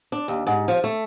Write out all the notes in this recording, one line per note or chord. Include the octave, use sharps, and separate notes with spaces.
D4
D#2
G#2
F3
A3